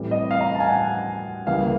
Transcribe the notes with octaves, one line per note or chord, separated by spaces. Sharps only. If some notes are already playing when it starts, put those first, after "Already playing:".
Already playing: A2 E3 G3 C4
D#5
F5
A#5
A5
G#5
F#5
C#2 C#3 E3 G3 A#3 F5